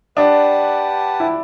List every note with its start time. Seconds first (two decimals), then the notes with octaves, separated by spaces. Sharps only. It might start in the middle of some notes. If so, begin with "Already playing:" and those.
0.17 D4 G4 B4 F#5 A5
1.20 E4